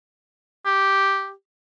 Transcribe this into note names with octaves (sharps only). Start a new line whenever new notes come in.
G4